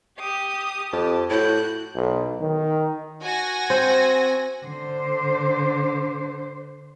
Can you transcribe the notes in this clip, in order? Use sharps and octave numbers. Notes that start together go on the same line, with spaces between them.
G4 D#6
F2 G4 A5
A2 E4 F#4 F#6 G6
B1
D#3
F#4 G#5 A#6
C4
D3 C5